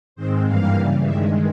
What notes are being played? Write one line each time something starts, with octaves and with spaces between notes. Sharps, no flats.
G#2 D#3 G#3 C4 C5
G2 E3 G3 A#3 F5
C#3 E3 G3
G2 D#3 G#3 E5